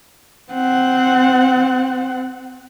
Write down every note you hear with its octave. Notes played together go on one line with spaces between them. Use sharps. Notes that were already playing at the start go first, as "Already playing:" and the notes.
C4 F#5